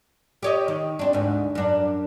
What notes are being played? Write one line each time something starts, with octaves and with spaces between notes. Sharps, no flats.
G4 C#5 D#5
D#3
C4 D4
D2 G#2
F#2 D4